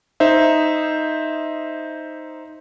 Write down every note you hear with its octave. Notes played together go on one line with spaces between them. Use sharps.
D#4 C5 E5